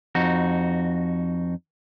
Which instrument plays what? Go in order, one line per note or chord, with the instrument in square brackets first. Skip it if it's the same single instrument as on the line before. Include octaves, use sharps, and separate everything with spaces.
[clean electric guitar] F2 D#4 F#4